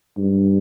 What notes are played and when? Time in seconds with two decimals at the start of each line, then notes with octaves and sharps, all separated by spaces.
0.18 G2